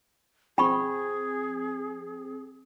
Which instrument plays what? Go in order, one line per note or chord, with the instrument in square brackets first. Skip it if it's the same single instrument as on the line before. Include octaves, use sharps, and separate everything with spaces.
[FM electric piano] F3 C4 [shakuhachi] G#4 [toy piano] G5 B5 C#6